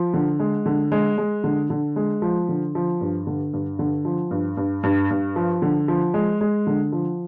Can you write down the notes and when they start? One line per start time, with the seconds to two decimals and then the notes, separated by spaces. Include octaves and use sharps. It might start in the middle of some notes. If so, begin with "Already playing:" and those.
Already playing: F3
0.14 D3
0.39 G#3
0.66 D3
0.92 G#3
1.18 G#3
1.44 D3
1.70 D3
1.96 G#3
2.22 F3
2.49 D3
2.75 F3
3.01 G2
3.27 D3
3.53 G2
3.79 D3
4.05 F3
4.31 G2
4.57 G2
4.83 G2
5.10 G2
5.36 F3
5.62 D3
5.88 F3
6.14 G#3
6.41 G#3
6.67 D3
6.92 F3